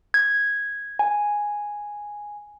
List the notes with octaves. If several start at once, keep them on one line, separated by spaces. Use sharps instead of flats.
G#6
G#5